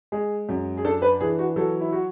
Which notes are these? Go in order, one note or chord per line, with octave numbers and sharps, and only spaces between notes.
G#3 G#4
F#2
G#4
D4 A4
B4
E3 G#4
F#4
F#3 A4
E4
F#4